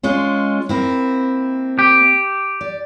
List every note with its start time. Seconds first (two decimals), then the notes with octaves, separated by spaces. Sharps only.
0.03 G#3 C#4 F4
0.69 A#3 C4 E4
1.79 G4
2.61 D5